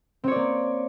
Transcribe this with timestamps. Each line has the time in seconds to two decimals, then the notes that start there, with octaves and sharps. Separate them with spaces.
0.24 C4
0.28 C#5
0.32 D5
0.36 A#3